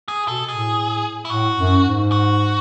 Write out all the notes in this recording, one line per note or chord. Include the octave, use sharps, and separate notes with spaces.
G#4
B2 A4
A2 G#4
E4
A2 F#4
F#2
G#2
F#4